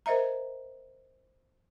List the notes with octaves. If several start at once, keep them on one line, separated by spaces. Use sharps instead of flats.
A#4 C5 D#5 E5 A#5